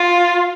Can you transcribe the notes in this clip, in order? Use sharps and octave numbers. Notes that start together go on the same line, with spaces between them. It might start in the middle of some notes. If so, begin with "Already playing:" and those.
Already playing: F4